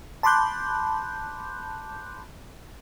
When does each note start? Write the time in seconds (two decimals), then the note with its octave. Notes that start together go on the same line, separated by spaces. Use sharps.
0.23 A5 B5 C6 D6 F#6 G6